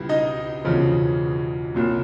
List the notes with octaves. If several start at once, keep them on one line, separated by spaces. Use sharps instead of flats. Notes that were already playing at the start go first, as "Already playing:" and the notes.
Already playing: C#2 B2 G3 B3 E4
D#4 D#5
E1 E2 C#3 F3
C2 A#2 F#3